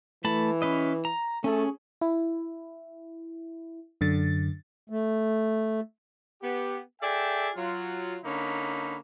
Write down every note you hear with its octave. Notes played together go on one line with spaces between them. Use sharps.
E3 A3 A5 B5
C#4 B4 D#5
A#5
A3 C#4 G#4
E4
F#2 D3 A6
A3
B3 G4
G#4 A4 D5 E5 G5
F#3 F4
D3 A#3 C#4 D#4 B5